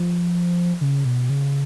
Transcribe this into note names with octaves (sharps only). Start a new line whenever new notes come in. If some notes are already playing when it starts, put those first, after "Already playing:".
Already playing: F3
C#3
B2
C#3